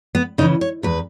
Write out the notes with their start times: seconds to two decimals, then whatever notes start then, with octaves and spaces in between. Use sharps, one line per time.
0.15 B3
0.38 C#3 E3 D#4
0.61 C#5
0.83 E2 B4